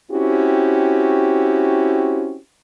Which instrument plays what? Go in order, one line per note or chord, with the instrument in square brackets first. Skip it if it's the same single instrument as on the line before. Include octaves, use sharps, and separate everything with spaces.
[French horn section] C4 C#4 E4 F#4 G4